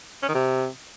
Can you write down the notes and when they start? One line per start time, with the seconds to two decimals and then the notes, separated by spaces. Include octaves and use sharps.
0.23 C#4
0.29 D#3
0.34 C3